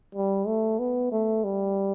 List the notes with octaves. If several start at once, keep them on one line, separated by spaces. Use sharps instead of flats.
G3
A3
B3
A3
G3